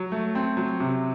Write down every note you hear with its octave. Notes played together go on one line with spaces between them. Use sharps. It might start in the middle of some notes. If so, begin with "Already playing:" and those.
Already playing: F#3
A3
C4
F#3
C3